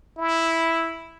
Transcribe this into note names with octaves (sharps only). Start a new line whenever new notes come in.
E4